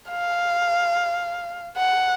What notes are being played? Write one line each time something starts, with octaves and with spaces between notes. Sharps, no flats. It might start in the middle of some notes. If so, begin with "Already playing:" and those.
F5
F#5